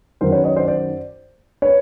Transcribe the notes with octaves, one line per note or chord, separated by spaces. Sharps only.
F#2 D#3 F#3 A#4 C5
B4 C#5
C#5 D#5
C5 D5
C5 D5
B4 C#5